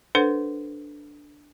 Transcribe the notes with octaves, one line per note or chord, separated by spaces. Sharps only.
D4 A4 B4 C5 F#5